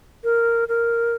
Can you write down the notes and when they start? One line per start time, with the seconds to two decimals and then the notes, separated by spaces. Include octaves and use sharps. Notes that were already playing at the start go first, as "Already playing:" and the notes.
0.24 A#4
0.68 A#4